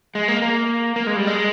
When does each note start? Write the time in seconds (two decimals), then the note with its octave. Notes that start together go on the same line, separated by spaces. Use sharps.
0.15 G#3
0.28 A#3
0.42 A#3
0.96 A#3
1.07 G#3
1.16 G3
1.27 G#3